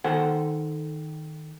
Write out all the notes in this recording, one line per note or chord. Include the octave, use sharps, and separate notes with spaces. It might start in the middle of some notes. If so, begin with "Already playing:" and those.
D#3 A4 C5 F#5 G#5